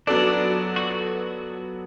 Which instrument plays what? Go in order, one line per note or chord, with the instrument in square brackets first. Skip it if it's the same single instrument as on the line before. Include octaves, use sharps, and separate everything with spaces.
[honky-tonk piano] F#3 B3 F#4 A4 D5 [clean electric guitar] D4
[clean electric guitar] F#4